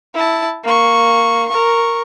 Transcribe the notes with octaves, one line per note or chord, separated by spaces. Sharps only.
E4 A5
A#3 C#6
A#4 C#6